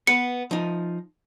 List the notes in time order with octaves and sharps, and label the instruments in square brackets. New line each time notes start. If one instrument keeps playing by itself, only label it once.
[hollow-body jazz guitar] B3 B4 [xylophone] C#7
[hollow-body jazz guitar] F3 D#4